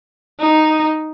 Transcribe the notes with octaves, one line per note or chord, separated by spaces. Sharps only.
D#4